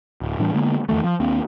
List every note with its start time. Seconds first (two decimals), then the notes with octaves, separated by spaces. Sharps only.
0.21 D1
0.39 A2 E3 G3 D4
0.54 D3 G#3 A#3 B3
0.89 E2 D#3 E3 A3
1.04 F3
1.20 D#2 A#3 C4 D4